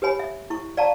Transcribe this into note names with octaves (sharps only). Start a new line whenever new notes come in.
G4 B4 C#5 G#5 B5
E5
E4 C#6
D5 F5 A5 A#5 C#6